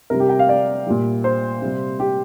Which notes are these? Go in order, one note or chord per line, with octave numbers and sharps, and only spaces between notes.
C3 G3 A#4
G4
G5
F5
D5
A#2 G3
C5
C3 G3
G4